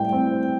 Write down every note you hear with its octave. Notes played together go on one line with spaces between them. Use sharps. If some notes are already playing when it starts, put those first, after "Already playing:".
Already playing: A2 G3 E4 G5
C4